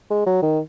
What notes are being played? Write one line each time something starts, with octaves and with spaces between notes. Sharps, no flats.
G#3
F#3
D#3